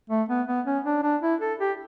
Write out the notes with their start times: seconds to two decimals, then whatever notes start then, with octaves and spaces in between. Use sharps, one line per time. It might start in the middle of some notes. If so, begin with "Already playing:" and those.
0.10 A3
0.29 B3
0.47 B3
0.66 C#4
0.85 D4
1.03 D4
1.22 E4
1.41 A4
1.59 G4